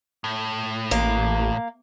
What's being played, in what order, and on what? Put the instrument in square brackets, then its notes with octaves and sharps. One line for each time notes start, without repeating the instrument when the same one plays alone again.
[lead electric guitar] A2
[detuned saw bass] A1 [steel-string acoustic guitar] A#3